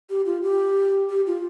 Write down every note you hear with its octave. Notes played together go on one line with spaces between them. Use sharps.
G4
F4
G4
G4
F4